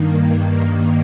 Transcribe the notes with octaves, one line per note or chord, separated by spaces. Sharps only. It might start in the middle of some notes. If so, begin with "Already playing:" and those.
Already playing: G2 D#3 A#3